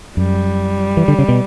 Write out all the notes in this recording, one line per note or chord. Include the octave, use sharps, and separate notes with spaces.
F#2 G3
E3
D3
C#3
B2